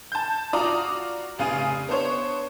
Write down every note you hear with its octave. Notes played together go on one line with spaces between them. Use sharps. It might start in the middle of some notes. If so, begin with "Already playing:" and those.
A5 G6
F4 F#4 D5 A#5 D6 D#6
F1 C#3 F5 G#5 D#6 D#7
B3 D4 C5 C#5